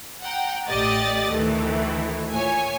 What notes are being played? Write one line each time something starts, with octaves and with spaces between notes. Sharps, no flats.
F#5 G5 A#5
A1 A3 G4 D5 D#5 A6
D2 D#3 E3 A3
A#2 C#5 G#5